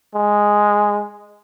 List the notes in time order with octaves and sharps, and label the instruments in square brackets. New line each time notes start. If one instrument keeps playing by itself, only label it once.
[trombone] G#3